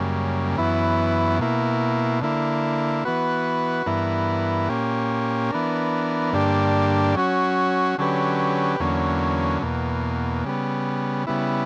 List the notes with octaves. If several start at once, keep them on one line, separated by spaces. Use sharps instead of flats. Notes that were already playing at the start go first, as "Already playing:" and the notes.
Already playing: F#2 C#3 G3 A#3
F#2 E3 B3 E4
B2 A#3 E4
D3 A#3 E4
E3 B3 F#4 B4
G2 E3 B3 E4 A#4
A#2 A#3 C#4 G4
E3 B3 D4 A#4
G2 D3 A#3 D4 G4
F#3 C#4 F#4
D3 F#3 C#4 G4 B4
E2 D3 F#3 A#3 C#4
E2 B2 A#3
C#3 G3 B3
C#3 G3 B3 E4